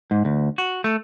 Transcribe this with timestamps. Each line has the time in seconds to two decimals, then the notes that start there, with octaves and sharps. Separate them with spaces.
0.11 G#2
0.25 D2
0.58 F#4
0.84 A3